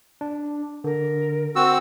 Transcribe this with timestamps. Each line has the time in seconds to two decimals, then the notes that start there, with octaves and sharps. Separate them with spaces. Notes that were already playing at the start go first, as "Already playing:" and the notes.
0.21 D4
0.84 D3 A#4
1.56 C4 F#4 E6